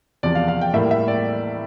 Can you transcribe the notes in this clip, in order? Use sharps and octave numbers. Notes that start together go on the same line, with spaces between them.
E2 C3 F3 D5
F5
F5
G5
A2 G3 A#3 E5
E5
D5